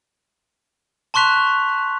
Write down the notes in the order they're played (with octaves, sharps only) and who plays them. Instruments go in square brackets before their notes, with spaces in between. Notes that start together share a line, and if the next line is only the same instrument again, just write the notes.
[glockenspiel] A5 C6 C#6 F#6 B6 F7